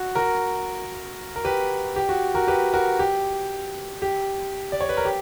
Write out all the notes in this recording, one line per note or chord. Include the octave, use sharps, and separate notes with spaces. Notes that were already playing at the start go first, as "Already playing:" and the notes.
Already playing: F#4
F#4 A#4
A#4
G4 B4
G4
F#4
F#4 A#4
G4 B4
F#4 A#4
G4
G4
D5
C#5
B4
A#4
G4